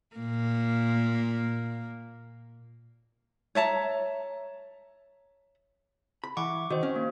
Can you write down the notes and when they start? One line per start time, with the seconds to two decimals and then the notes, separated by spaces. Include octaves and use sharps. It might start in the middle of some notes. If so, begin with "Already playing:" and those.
0.16 A#2 A#3
3.55 C#5 E5 A5 A#5
6.24 B5
6.37 E3 F#5 C#6 D6
6.70 D#3 F#4 C5
6.83 C#4
6.96 A#3